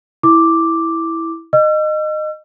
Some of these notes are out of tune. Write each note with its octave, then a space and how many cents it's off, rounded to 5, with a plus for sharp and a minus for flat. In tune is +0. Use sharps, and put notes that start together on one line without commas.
E4 -5 D6 +0
D#5 -15 E6 +45